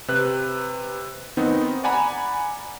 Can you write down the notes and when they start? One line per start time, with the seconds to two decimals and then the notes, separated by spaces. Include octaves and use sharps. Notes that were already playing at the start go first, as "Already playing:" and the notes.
0.08 C3 B4 F#6
1.37 D#3 B3 C4 D#4
1.84 D5 F#5 G#5 A#5 B5